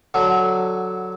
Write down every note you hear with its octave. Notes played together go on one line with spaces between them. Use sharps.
D3 F#3